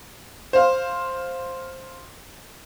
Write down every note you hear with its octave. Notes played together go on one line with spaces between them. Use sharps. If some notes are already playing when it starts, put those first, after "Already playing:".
C5 F5